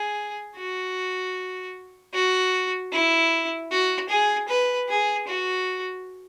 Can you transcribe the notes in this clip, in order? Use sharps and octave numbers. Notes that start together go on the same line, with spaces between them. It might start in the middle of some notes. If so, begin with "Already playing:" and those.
Already playing: G#4
F#4
F#4
E4
F#4
G#4
B4
G#4
F#4